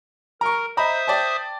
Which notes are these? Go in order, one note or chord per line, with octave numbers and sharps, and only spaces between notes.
A#4 A#5 C#6
C5 D#5 E5 A#5 B5 D#6
D5 G5 A5